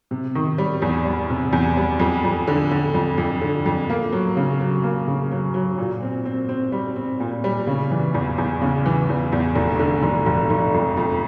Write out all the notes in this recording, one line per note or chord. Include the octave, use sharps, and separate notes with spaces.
C3
D#3
G3
E2
G3
C3
E2
G3
F2
F2
D3
D3
F2
F2
D3
F2
A#3
F#3
C#3
F#3
A#3
C#3
F#3
F#3
A#2
C4
C4
C4
G3
C4
A#2
G3
C#3
E3
E2
E2
C#3
E3
E2
E2
F1
D3
F1
F1
F1
F2
F2